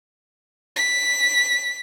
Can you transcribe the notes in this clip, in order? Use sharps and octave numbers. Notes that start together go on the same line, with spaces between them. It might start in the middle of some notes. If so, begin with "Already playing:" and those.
B6